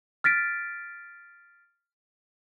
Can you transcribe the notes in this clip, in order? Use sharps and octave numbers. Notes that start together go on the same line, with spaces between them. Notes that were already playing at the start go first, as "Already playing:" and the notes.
F6 A6 B6 D7